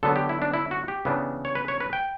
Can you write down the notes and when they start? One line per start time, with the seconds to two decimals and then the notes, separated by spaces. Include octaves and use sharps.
0.03 D3 F#3 B3 A4
0.16 G4
0.29 E4
0.42 D4
0.54 E4
0.71 F#4
0.88 G4
1.05 C#3 E3 B3 D4
1.45 C#5
1.55 B4
1.68 C#5
1.80 B4
1.93 G5